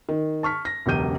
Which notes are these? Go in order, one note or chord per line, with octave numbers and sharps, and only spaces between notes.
D#3
A5 C#6 F6 B6
A#6
E1 C#2 F#2 G4 G6 D#7